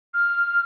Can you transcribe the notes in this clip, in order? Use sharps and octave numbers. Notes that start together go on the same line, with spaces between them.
F6